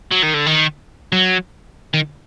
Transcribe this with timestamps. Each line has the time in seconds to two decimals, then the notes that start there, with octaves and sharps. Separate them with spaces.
0.12 F#3
0.23 D#3
0.34 D3
0.46 D#3
1.13 F#3
1.94 D#3